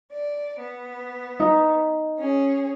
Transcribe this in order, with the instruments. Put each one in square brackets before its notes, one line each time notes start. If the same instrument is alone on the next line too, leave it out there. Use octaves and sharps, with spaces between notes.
[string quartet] D5
B3
[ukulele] D#4
[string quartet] C#4 G#4